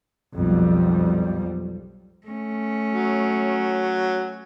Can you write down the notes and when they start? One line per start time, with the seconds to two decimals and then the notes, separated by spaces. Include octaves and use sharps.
0.36 B1 F2 G3
2.27 A3 C#4
2.94 F#3